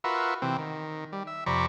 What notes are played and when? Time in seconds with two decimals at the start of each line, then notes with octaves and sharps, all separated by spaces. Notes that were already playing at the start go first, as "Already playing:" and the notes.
0.04 F4 F#4 A#4 B4 E5
0.42 C3 E3 C4
0.58 D#3
1.13 G3
1.27 E5
1.46 F2 C3 D5 A#5 B5 C#6